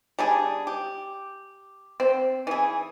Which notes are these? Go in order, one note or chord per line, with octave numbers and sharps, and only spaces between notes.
G3 D4 G#4
G4
C4
E3 G#4